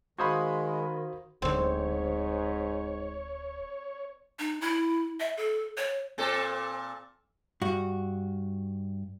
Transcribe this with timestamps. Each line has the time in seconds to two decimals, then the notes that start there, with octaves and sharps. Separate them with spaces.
0.19 D#3 G#3 F#4 C5 F5 B5 D#6 G#6
1.42 D1 G#2 D3 C4 C#5
4.39 D#4
4.61 E4
5.20 E5
5.37 A4
5.78 C#5
6.18 A#2 C4 A4
7.62 G2 F#4